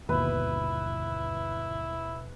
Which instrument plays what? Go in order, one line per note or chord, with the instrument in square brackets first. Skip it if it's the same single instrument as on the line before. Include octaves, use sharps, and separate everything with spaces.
[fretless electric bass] D1 G1 [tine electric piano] D#2 B2 [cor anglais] E4 [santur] B4